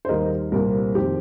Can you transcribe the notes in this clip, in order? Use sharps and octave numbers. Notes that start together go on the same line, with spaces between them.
C5
D#2 D#3 G3 A#4 D#5
C2 A#2 G3 C4 A#4
F2 D#3 C4 G4